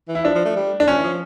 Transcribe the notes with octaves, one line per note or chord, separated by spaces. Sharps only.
E3
E4
F3 D4
F3
A3
G3
D4
F3 C#4
E3
F3